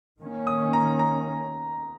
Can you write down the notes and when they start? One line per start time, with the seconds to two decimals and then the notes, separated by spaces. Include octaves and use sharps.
0.19 D#3 A#3 C#4
0.47 D#6
0.73 A#5
0.99 A#5